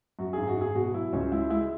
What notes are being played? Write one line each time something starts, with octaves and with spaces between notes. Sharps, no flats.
F#2 F#4
G#1 G#4
F#4
G#1 G#4
B2 F#4
F#3 E4
C#2 C#4
G#3 E4
G#3 E4